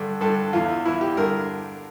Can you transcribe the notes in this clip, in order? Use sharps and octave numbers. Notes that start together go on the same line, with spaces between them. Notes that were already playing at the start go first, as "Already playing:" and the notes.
Already playing: G2 D3
G2 D3 A4
E2 E3 F4
E2 E3 E4
G4
G2 D3 A#4